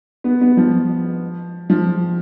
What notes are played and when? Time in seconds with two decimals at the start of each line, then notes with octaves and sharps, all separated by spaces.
0.24 B3
0.41 B3
0.57 F3
1.70 F3